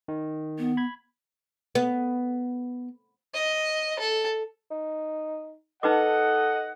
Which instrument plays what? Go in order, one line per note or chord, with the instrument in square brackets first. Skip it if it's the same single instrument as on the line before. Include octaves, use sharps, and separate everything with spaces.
[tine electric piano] D#3
[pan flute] B3
[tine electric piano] B5 G#6
[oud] B3
[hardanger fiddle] D#5
A4
[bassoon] D#4
[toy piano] D#4 B4 D6 [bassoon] A4 [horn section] D#5 F#5